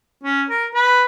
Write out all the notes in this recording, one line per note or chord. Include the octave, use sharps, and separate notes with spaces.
C#4
A#4
B4